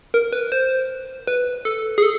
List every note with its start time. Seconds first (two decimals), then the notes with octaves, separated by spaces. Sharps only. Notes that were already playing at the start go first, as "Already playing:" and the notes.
0.14 A#4
0.33 B4
0.52 C5
1.27 B4
1.65 A4
1.98 G#4
2.03 A4